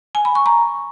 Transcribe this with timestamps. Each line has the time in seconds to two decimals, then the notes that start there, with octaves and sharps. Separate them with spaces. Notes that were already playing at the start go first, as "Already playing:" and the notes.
0.15 G#5
0.25 B5
0.35 C#6
0.46 A#5